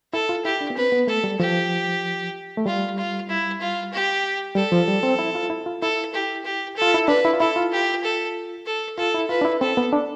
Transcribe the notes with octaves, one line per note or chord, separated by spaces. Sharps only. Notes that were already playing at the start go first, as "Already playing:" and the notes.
E4 A4
F4
E4 G4
D4
B3
C4 B4
B3
A3 A4
G3
F3 G4
A3
G3 F4
F4
E4
F4
G4
G3 A4
F3
G3
C4
E4
F4
E4
F4
E4 A4
G4
G4
A4
F4
E4
D4 B4
E4
F4
E4 A4
F4
G4
A4
A4
F4 A4
E4
F4 B4
D4
E4
C4 A4
B3
D4